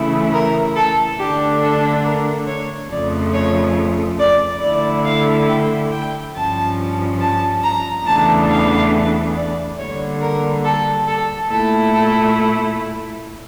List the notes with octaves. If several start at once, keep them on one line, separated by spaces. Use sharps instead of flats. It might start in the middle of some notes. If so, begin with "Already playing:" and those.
Already playing: C#3 E3 A3 E4
A#4
A4
D3 A3 D4 G4
A4
A#4
C#5
F2 C#3 F3 A3 D5
C#5
D5
D3 A3 E4 D5
F5
G5
G5
G2 F3 C#4 A5
A5
A#5
E2 C#3 E3 A3 D4 A5
F5
D5
D3 G3 A#3 C#5
A#4
A4
A4
A#2 A3 E4 A4
A4